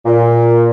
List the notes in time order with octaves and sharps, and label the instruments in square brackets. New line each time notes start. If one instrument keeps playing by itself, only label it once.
[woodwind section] A#2